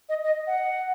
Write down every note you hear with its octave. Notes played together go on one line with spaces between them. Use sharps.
D#5
D#5
F#5